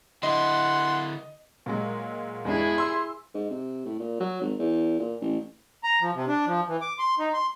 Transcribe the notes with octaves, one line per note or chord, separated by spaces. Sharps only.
D3 E4 D#5 F#5 C6
A#2 F#3 G#3
E2 G#3 D4 E4 G#4
C6 E6
G#2
C3
A2
A#2
F#3
G#1
E2
A#2
A1
A#5
F3
C3
D4
F3
E3
D6
C6
D#4
C6